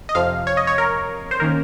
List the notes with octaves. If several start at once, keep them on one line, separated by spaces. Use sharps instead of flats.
D#5
F2 C3 F3 F5
C#5
D#5
C#5
A#4
C5
D#3 A#3 C#4 A#4